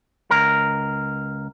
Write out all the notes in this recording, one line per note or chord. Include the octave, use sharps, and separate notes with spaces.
C#2 A#4